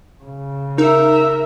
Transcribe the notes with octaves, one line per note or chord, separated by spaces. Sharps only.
C#3
D#4 A#4 E5